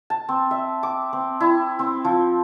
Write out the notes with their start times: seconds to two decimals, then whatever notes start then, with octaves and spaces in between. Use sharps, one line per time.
0.10 A5
0.29 C4
0.51 E5
0.83 D6
1.13 C4
1.40 E4
1.79 C4
2.05 F3